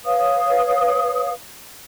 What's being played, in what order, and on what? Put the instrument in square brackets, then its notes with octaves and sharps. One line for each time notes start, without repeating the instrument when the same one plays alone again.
[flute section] B4 C#5 F5 D#6